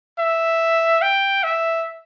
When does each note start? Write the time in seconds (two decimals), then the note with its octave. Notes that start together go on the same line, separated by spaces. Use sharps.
0.19 E5
1.02 G5
1.44 E5